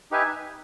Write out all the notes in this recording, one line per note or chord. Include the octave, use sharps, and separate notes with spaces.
D#4 G4 B4 E5 G#5